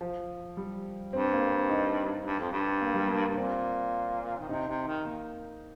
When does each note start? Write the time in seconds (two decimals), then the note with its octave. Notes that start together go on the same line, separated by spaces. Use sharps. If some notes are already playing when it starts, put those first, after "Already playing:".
0.01 F3
0.57 G3
1.13 G2 C4
1.32 A#3
1.50 C4
1.69 D#4
2.26 G2
2.39 F2
2.52 G2
2.81 A#3
2.94 G3
3.09 A#3
3.29 G2
3.37 A#2 C4
4.39 D#3
4.49 C3 D#4
4.68 C3
4.87 D#3
5.05 A#3